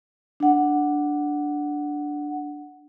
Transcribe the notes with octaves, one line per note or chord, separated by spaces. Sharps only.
D4 F#5